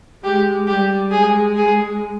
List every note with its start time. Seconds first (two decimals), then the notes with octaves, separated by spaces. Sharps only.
0.24 G#3 G4
0.67 G3 G4
1.11 G#3 G#4
1.56 G#4